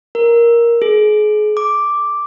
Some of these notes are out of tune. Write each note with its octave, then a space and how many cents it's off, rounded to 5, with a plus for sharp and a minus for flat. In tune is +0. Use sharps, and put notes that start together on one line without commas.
A#4 +5
G#4 +30
D6 +0